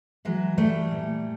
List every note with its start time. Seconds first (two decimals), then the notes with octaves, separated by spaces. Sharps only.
0.25 E3 F#3 G#3
0.57 E3 G3 A3
0.91 A#2